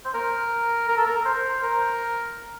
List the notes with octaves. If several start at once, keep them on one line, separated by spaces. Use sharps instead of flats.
C5
A#4
A#4
A4
A#4
C5
A#4